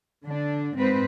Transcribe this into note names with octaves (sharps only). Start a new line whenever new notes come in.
D3 D4
G#2 C4 B4 C5